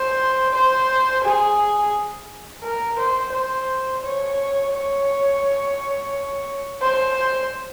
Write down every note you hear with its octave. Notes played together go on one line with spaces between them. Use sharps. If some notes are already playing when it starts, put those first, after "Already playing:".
Already playing: C5
C5
G#4
A#4
C5
C5
C#5
C#5
C5